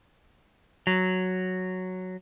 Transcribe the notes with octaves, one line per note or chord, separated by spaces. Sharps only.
F#3